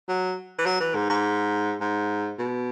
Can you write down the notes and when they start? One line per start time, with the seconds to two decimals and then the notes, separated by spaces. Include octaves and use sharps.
0.08 F#3
0.59 E3
0.66 F#3
0.80 E3
0.95 G#2
1.09 G#2
1.81 G#2
2.39 B2